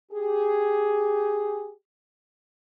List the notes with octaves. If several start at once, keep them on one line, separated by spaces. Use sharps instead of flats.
G4 G#4